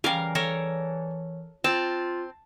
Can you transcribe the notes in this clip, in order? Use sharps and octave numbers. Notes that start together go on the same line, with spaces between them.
C#3 E3 G3 A#4 F5
A4 A#4 C#5
C4 F4 A5